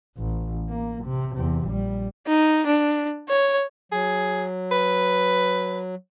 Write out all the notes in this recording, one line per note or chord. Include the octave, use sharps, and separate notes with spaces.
A1
A#3
C3
E2 C3
A#1 G3
D#4
D4
C#5
F#3 G#4
B4